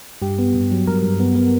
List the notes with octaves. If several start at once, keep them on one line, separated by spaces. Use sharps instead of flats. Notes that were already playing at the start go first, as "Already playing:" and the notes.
G2 G4
B3
G2
F#3
G2 A#4
G2
B3
B3